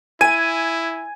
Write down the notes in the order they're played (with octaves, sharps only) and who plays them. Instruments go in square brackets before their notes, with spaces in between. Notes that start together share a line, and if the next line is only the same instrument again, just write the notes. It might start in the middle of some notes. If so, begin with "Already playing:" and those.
[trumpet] E4 [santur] G#5 [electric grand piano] G#6 D#7